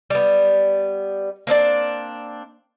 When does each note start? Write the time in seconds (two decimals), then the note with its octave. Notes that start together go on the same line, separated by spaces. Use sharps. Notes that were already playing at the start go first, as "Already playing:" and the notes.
0.10 G3 B3
1.47 A#3 C4 D4 D5